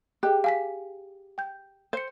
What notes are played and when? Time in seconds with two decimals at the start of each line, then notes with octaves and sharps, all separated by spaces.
0.23 G4 G#4 D#5 F#6
0.44 F5 G#5 B6
1.38 G5 G6
1.93 C5 G6 C#7